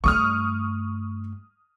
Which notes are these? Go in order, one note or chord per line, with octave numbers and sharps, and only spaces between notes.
G2 A3 C#6 D#6 F6